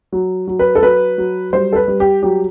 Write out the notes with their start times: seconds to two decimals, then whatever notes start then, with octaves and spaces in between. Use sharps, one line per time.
0.12 F#3
0.47 F#3
0.59 B4
0.75 A4
0.82 F#3 B4
1.18 F#3
1.53 G3 C5
1.73 A4
1.76 B4
1.88 G3
2.00 G4
2.22 F#3 G4